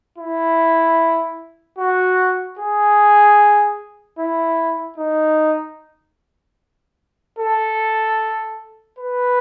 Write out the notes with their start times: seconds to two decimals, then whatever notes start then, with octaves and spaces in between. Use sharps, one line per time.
0.18 E4
1.79 F#4
2.59 G#4
4.19 E4
4.98 D#4
7.39 A4
8.99 B4